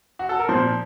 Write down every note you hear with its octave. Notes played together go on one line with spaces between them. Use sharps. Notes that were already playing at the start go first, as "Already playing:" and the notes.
F#4
A4
A#4
A#2 F3 C5